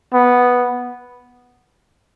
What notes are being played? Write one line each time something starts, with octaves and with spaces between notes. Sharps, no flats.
B3